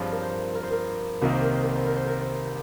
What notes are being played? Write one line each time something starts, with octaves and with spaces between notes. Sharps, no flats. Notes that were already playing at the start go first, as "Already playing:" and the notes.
Already playing: G2 F3 C4 F4 G#4 C#5
A#4
C5
A#4
C5
A#4
C2 C3 D#3 A#3 D#4 A#4
C5
A#4
C5
A#4
C5
A#4
C5
A#4
C5